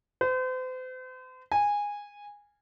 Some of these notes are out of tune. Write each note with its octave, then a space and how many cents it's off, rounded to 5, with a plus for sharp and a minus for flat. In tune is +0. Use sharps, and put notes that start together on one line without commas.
C5 -40
G#5 -15